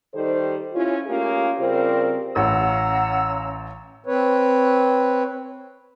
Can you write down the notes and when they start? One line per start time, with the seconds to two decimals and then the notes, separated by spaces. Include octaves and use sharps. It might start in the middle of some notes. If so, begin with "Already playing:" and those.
0.14 D#3 G3 D#4 A4 C5
0.73 C#4 E4 F4
1.07 A3 A#3 C#4 F4 G4 G#4
1.58 C#3 G3 C4 F4 A#4 C5
2.36 A1 C#4 F5 F#5 A#5 E6
4.06 C4 B4 C#5